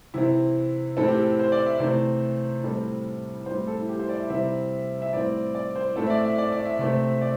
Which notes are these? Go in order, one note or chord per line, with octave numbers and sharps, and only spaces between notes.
C3 E3 C4 E4
A2 E3 C4 A4
G4
A4
C5
D5
E5
C3 E3 A3 C4 C5
A2 G3 C4 A4
A2 G3 C4 C5
A4
E4
G4
C5
D5
E5
C3 E3 G3 C4 E5
E5
A2 E3 G3 C4 D5
D5
C5
A2 A3 C4 A4
E5
D5
E5
D5
D5
E5
C3 A3 C4
D5